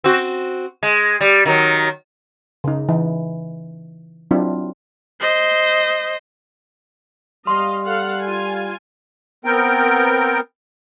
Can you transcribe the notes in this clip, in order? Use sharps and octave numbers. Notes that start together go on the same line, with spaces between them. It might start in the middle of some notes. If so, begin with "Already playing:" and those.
C4 F#4
G#3
G3
D#3 F#3
C#3 D#4
E3 D#4
F#3 C4 D4 E4 F4
C5 D#5
G3 D#5 F5 C6
A4 F5 F#5
F4 G#5
B3 C4 A#4 G5